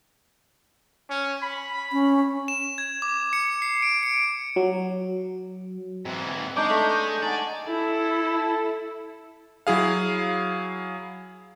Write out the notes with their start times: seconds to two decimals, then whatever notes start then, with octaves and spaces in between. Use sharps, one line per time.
1.10 C#4
1.42 B5
1.92 C#4
2.48 E7
2.78 G#6
3.02 D6
3.33 C#7
3.62 C7
3.82 D7
4.03 C#7
4.56 F#3
6.05 G#2 E3 C4
6.57 G#3 D4 D#4 C#6 D6 G6
6.70 A3
7.23 D#4 D5 F#5 G#5 A5
7.68 E4 A4
9.67 F#3 E4 G#4 F5